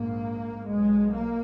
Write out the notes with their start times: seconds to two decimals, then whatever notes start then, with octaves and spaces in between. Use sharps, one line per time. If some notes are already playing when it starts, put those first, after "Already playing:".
Already playing: A#1 G#2 A#3
0.68 B1 B2 G#3
1.12 A#3